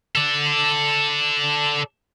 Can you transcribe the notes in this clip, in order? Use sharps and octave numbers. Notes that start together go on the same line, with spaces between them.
A4 D5